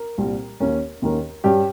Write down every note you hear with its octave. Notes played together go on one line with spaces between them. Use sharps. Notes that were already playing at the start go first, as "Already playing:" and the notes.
Already playing: A#4
C2 A#2 G3 C4
D#2 D#3 A#3 C#4
D#2 D#3 A#3 C#4
G2 G3 C#4 G4